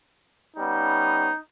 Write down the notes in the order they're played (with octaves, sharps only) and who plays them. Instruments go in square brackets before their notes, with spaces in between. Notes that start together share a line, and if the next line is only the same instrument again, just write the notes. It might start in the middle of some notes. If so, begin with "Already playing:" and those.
[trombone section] G3 B3 C#4 [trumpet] D#4